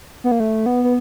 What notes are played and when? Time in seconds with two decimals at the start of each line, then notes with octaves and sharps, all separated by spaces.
0.24 B3
0.31 A#3
0.40 A3
0.66 B3
0.84 B3